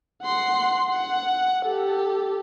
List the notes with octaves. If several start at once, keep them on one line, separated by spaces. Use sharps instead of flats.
F#5 C6
F#5
G4 A4